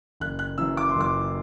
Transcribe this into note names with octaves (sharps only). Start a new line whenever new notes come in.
F#1 F#6
F#6
F#2 E3 E6
D6
C6
F#1
D6